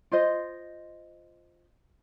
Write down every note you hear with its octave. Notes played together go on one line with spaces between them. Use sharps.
F4 C5 D#5